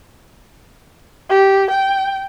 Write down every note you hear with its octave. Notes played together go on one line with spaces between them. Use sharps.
G4
G5